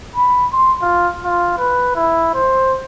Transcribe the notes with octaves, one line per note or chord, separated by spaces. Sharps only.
B5
C6
F4
F4
B4
E4
C5